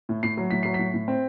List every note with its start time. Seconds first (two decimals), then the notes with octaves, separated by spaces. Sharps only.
0.09 A2
0.23 A2 C7
0.37 F#3
0.50 A2 B6
0.63 F#3 C7
0.74 A2 B6
0.94 A2
1.08 C4